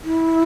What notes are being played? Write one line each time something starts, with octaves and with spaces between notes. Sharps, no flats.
E4